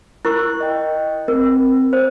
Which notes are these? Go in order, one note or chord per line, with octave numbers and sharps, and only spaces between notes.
E4 A#4 C#6 F#6
D#5 G5
C4 A#4
C5